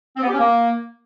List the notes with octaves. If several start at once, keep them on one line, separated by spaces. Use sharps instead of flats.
C4
B3
G4
C#4
A#3